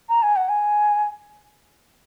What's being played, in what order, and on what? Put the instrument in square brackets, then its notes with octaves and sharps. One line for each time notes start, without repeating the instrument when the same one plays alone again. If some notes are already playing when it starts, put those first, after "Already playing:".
[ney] A#5
G#5
F#5
G#5